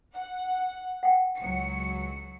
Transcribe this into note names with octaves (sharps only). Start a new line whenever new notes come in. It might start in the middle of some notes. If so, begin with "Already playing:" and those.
F#5
F#5 G5
C#2 F#3 C#7